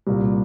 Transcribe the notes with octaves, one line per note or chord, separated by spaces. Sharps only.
C2 A#2